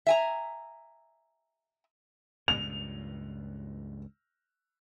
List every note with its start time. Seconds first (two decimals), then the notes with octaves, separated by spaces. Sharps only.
0.07 E5 G#5 A#5
2.48 C#2 G2 A#2 F7